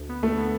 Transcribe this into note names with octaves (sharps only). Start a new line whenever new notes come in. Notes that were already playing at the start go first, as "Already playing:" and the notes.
Already playing: D2
B3
D2 A3
B3